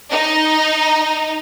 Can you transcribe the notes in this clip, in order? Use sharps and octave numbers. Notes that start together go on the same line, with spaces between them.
D#4